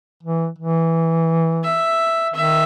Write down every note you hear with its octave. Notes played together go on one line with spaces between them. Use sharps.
E3
E3
E5
D#3 E5